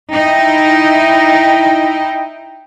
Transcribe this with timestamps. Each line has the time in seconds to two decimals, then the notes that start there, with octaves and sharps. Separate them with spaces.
0.12 D#4 E4 G5